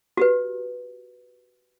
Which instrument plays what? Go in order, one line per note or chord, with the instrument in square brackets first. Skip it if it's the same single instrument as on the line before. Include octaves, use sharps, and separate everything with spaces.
[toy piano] F#4 G4 B4